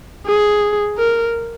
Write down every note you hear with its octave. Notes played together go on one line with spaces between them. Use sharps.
G#4
A#4